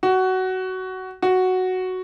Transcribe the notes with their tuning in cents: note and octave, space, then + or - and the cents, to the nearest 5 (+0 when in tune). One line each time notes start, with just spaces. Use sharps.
F#4 +15
F#4 +0